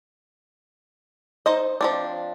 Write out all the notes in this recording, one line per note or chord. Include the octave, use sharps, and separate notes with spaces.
D#4 C5 D#5
F3 C4 D4